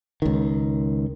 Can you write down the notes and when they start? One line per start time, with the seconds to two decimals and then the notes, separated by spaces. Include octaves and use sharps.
0.22 C#2 D#3